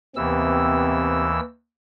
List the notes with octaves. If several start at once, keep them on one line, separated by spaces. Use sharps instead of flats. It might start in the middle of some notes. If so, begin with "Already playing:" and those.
D#2 C3 E3 B3 C4 E6